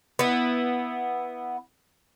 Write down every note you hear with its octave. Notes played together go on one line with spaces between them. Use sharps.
B3 E4